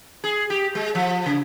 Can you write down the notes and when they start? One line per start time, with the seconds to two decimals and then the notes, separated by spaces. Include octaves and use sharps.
0.24 G#4
0.50 G4
0.75 G#3
0.95 F3
1.26 C#3